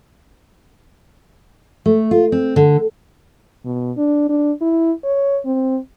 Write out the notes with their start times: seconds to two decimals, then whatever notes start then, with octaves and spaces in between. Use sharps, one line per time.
1.86 A3
2.11 F4
2.32 C4
2.56 D3
3.65 B2
3.97 D4
4.29 D4
4.61 E4
5.04 C#5
5.45 C4